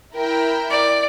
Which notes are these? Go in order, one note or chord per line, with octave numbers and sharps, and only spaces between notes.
E4 A#4 G5
D5